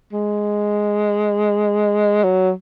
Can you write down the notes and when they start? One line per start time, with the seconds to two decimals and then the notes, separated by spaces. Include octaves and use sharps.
0.13 G#3
2.24 F#3